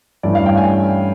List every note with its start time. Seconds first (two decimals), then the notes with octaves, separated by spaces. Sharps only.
0.23 G2 E3 A3 C#4 D5
0.35 F5
0.46 G5
0.57 G#5